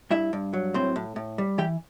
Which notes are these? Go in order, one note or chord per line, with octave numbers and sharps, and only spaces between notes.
G2 E4 E5
G2
F#3
A2 C4 C5
A2
A2
G3
E3 G4 G5